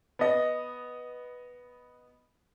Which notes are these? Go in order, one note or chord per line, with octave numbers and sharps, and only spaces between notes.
B3 D#5